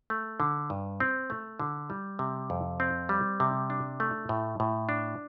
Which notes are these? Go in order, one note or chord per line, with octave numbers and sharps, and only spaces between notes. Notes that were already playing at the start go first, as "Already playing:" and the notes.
A3
D3
G2
C4
A3
D3
G3
C3
F2
C4
G3
C3
D4
A3
A2
A2
D4